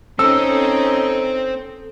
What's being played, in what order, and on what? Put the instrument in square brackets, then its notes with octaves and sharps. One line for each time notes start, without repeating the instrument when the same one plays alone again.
[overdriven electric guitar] C4 C5 [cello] C#4 D#4 [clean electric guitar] A4 [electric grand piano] E6